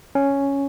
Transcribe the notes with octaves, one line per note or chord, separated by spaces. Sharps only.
C#4